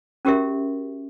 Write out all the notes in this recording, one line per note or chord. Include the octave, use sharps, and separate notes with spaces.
C#4 F#4 G4 A#4 E5